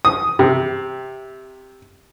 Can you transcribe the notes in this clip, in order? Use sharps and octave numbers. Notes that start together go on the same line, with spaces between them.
D#6
C3